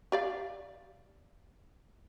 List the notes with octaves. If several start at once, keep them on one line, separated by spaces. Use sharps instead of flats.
G4 D5 F5